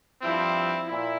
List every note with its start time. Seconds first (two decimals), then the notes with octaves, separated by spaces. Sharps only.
0.22 G2 F3 C4 E4
0.89 A#2 E4